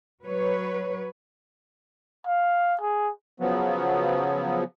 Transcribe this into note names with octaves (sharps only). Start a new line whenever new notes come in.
F#3 B4 C#5
F5
G#4
C#3 F3 F#3 B3